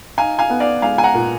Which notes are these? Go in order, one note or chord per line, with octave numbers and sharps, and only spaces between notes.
D#4 F5 G#5
F5 G#5
B3
D5 F5
G#3 F5 G#5
G#5
F#5 A#5
A#2